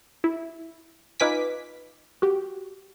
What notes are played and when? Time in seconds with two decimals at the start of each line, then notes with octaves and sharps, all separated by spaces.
0.24 E4
1.20 D#4 F4 B4 G#5 D6 B6
2.22 F#4 G4